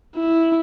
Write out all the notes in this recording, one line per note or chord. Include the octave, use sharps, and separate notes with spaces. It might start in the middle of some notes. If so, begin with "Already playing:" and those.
E4